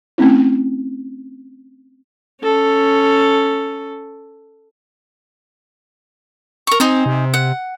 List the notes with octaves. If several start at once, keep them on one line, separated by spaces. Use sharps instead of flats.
A3 C4 C#4 E4
C#4 A4
A#4 C#6
C4 D#4 C5 G#5
C3
F#5